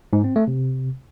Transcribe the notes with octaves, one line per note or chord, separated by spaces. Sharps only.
G#2
C4
A3
C3